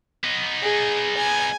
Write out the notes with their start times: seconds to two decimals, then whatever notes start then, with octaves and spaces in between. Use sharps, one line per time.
0.24 B3 D#4
0.62 G#4
1.17 G#5